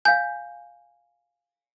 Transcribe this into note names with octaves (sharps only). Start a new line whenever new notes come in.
F5 G#5 G6